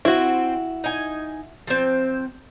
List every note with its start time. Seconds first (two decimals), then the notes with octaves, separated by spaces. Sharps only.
0.05 C4 E4 F#4
0.84 D#4 G#5
1.67 F3 C4